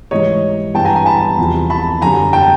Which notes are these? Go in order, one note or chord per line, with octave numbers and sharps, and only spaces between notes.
G#2 E3 G3 C#5 D#5
G2 E3 G3 B3 G5 A5
G#5 A#5
G#5 A#5
A5 B5
E2 C3 F3
A5 B5
F#2 D3 G3 G#5 A#5
G5 A5